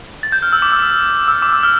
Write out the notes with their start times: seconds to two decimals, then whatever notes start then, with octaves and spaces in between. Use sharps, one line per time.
0.23 A6
0.32 G6
0.42 F6
0.53 E6
0.62 D6
0.72 E6
1.28 E6
1.42 D6
1.53 E6
1.63 F6